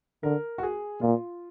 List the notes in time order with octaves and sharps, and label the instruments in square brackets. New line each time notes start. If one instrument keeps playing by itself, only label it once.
[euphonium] D3 [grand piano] A#4
[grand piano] F#4
G#4
[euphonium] A#2 [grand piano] F4